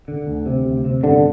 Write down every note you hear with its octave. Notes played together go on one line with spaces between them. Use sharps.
D3
D2
C3
D2
C3
G1 D3